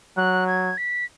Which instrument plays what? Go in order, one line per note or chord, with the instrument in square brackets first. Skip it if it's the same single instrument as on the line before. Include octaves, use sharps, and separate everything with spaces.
[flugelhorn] F#3 [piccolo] F#6
[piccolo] G#6
B6